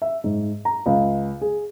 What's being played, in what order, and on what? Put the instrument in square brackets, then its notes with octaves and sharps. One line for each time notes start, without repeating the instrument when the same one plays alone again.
[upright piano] E5
G#2
A#5
C#2
G#4